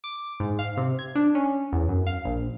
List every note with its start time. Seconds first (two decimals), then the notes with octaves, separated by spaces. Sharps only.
0.04 D6
0.40 G#2
0.59 F5
0.77 C3
0.99 G#6
1.15 D4
1.35 C#4
1.73 E2
1.88 F#2
2.07 F5
2.25 A#1